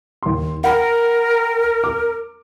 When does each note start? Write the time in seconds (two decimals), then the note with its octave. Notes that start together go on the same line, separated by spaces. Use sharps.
0.23 D#2 C6
0.64 A#4 F#5 G5 B5
1.84 D6